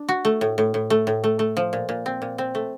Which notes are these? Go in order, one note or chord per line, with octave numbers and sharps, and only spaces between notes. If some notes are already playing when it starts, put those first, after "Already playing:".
Already playing: D4
F#4
A3
A2
A2
A2
A3
A2
A3
A3
F3
A#2
A#2
C4
A#2
C4
A3